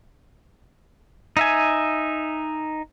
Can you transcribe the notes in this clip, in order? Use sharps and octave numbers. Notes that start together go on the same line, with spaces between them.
D#4 E5 G#5